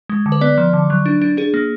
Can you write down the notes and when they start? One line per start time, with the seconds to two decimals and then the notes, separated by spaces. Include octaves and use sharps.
0.09 G#3
0.26 D3
0.32 B4
0.41 B3 D5
0.58 F3
0.73 D3
0.90 F#3
1.06 D4
1.22 D4
1.37 D4 G#4
1.54 A#3